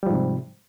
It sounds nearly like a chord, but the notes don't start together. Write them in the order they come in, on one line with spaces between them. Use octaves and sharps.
G3 F3 G#2 C3